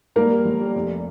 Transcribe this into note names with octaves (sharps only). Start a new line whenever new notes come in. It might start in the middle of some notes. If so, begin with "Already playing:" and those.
G2 A#3 A#4
G3
G1
G3
F1